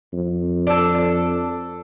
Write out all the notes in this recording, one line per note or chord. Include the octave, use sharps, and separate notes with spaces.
F2
D4 A4